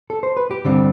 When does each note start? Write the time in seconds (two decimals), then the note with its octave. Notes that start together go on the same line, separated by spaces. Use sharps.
0.10 A4
0.23 C5
0.37 B4
0.51 G4
0.65 G2 D3 G3 C4